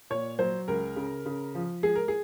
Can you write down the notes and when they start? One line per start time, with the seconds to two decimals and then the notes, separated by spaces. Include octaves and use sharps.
0.10 A#2 C#5
0.39 F#3 C5
0.68 C#2 A#4
0.96 C#3
1.26 C#3
1.55 F3
1.83 G#3 G#4
1.95 A#4
2.08 G#4